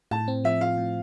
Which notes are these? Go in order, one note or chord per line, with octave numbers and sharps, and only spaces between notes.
A2 A5
C4
F3 E5
F4 F5
A2